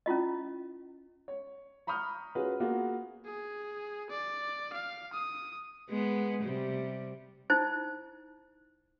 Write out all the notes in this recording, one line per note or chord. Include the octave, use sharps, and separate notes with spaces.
C#4 E4 F4 D#5
C#5
A#5 B5 C#6 D#6 F6 G6
C#4 F4 F#4 G#4 B4
A#3 B3 F4 F#4 G#4 B4
G#4
D5
F5
D#6
G#3 B3
C3 G3
D#4 E4 C5